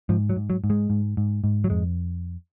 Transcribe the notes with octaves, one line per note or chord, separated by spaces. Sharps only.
G#2 F3
F#3
G#2
F#3
G#2
G#3
G#2
G#2
G#2
F#3
F2 G#3